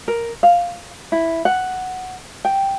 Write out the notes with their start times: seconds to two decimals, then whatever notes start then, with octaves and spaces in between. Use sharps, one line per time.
0.08 A#4
0.43 F5
1.12 E4
1.45 F#5
2.45 G5